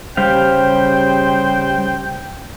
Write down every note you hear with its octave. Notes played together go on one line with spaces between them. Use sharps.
C#3 G3 G4 C5 F5 G5